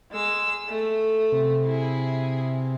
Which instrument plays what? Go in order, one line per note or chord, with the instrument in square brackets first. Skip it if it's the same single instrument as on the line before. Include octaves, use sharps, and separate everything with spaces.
[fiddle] G#3 E6
A3
[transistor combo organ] C3
[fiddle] E4 G#4